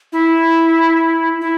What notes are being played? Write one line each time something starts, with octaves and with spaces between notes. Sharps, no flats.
E4
E4